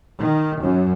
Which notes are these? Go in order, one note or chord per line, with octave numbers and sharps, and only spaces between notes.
D#3
F#2